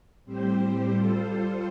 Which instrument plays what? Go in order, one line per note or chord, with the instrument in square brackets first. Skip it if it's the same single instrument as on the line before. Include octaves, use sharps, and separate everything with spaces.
[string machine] A2 G3 C4 G4 C5
G3 F4 A4 C5